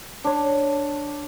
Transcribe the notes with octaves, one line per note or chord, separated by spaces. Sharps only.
D4 C#5